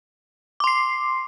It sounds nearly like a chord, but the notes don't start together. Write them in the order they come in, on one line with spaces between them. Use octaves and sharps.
D6 C6 C7